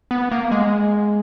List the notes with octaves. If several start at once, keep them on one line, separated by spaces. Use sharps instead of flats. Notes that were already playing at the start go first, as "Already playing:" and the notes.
B3
A#3
G#3